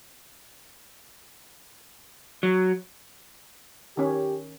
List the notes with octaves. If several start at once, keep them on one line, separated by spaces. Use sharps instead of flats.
F#3
D#3 C#4 G4